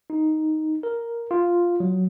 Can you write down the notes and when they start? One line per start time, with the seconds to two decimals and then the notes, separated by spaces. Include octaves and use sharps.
0.10 D#4
0.83 A#4
1.31 F4
1.80 F#3